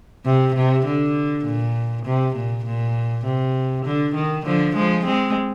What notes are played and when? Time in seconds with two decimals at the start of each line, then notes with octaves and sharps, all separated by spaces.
0.26 C3
0.55 C3
0.86 D3
1.45 A#2
2.05 C3
2.35 A#2
2.66 A#2
3.25 C3
3.85 D3
4.15 D#3
4.46 D3 F3
4.76 F3 G#3
5.05 G#3 C4